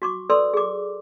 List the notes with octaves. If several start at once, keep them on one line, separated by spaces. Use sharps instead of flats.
F#4 C#6 D6
A4 B4 D5 C6 E6
G#4 D6